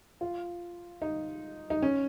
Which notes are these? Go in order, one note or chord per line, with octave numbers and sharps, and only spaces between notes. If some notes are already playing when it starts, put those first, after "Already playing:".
F4
D#4
D#4
C#4